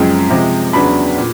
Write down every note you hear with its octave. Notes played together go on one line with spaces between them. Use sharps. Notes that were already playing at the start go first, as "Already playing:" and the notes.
Already playing: F#2 C#3 F3 G#3 C4
C3 F3 G#3
E2 C#3 F#3 B3 D4 B5
A#2